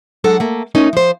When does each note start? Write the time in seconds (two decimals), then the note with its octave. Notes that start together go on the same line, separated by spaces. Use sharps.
0.24 F#3 G#3 D4 A4 F#5
0.40 A3 A#3
0.75 A3 C#4 D#4 A#4
0.93 F3 C5